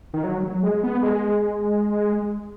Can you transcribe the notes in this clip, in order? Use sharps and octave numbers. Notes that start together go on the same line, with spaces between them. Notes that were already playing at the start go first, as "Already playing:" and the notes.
D#3
F#3
F#3
G#3
B3
G#3